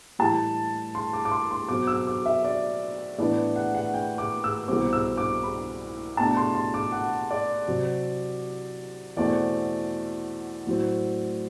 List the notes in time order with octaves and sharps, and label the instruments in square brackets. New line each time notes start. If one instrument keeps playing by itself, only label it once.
[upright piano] A2 E3 G3 A5
C6
D6
D6
C6
C6
B2 F#3 C4 D6
E6
D6
E5
D5
A2 E3 B3 D4 D5
F#5
F#5
G5
D6
E6
C2 B2 G3 C4 D6
E6
D6
B5
B2 A3 D4 A5
C6
C6
D6
F#5
D5
C3 F#3 C4
E2 B2 A3 C4 D5
A2 F#3 C4